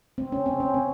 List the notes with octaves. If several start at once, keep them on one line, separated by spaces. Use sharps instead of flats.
C4
C#4
C4
C#4
C4